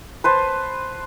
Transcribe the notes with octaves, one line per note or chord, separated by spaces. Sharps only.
B4 C5 A5